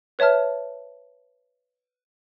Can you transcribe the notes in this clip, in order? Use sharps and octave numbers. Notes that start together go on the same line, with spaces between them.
B4 C#5 E5 A5 F6